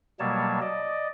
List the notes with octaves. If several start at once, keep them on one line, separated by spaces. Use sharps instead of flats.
B2 F#3 G3 A#3 C#5 A5
D5 D#5